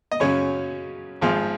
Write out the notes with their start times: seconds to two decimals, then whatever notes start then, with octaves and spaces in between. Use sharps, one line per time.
0.12 D#5
0.20 F#2 C#3 F#3 C#4 C#5
1.21 G#1 G#2 F3 G#4